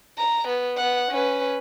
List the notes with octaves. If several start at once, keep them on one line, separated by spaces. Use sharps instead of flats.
A#5
B3
B3 F#5
C#4 B4